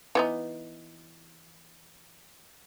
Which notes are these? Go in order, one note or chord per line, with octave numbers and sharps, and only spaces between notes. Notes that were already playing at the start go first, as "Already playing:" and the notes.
E3 B3 D#4